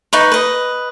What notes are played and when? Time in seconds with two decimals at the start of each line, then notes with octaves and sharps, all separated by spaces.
0.13 D#4 B4 C#6
0.32 B4 D#5